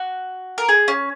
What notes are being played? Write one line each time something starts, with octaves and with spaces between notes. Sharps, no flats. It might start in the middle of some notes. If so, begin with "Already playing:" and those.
Already playing: F#4
A#4
G#4
C#4